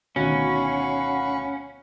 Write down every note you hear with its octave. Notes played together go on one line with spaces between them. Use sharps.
D2 B2 D#3 C#4 F#4 F5 B5 C#6